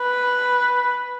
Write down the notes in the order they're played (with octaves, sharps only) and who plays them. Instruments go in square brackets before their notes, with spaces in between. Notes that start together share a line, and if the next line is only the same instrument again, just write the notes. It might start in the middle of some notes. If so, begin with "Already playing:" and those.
Already playing: [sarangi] B4